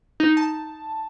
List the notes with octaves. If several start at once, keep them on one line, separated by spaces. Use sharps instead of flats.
D#4
A5